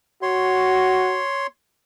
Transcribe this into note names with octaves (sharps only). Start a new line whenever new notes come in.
F#4 C#5 C6